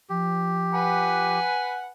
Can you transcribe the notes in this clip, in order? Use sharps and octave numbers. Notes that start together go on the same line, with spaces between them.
F3 G4
B4 F#5 G#5